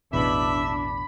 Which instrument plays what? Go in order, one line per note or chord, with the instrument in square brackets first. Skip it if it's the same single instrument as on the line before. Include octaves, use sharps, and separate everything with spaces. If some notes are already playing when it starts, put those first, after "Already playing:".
[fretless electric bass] A1 E2 B2 [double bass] D4 [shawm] E5 [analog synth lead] B5